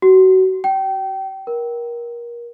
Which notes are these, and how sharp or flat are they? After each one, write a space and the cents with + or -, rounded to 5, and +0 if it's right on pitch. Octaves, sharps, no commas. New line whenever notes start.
F#4 +25
G5 -25
A#4 +25